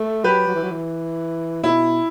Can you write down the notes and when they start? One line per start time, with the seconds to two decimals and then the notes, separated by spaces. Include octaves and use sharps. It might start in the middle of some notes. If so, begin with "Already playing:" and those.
Already playing: A3
0.24 F#3 G4 B4
0.47 F#3
0.55 E3
0.63 F#3
0.71 E3
1.63 B2 E4